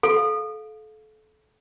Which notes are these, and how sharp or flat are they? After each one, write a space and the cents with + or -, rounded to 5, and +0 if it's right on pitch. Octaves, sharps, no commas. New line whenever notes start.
A4 -30 F5 +15